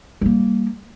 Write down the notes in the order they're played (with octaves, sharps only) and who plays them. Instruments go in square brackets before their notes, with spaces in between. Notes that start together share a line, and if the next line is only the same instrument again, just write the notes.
[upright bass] G3 A#3